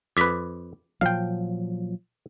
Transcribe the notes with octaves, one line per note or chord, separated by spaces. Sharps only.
F2 B4 D6 B6
A#2 F3 F#3 F5 G5